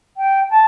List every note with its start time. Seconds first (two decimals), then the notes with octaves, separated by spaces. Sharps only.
0.17 G5
0.50 A5